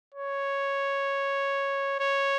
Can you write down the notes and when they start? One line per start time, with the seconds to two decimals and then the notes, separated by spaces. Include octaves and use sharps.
0.14 C#5
2.00 C#5